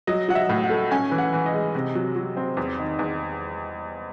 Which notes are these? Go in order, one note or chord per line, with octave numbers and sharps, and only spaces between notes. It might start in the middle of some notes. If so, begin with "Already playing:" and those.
F#3 D#5
F#3 F#5
E5
A2
F#5
A3
C#4 G#5
E3
F#5
E3
D#5
G#3
C3
F#3
F#3
C4
E2
D#3
E2